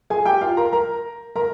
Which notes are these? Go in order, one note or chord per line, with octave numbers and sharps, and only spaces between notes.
G#4 G#5
G4 G5
F4 F5
A#4 A#5
A#4 A#5
A#4 A#5